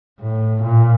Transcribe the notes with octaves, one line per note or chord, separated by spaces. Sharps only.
A2
A#2